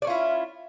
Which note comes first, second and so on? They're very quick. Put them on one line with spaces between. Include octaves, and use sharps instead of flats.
D5 C#4 F4 E4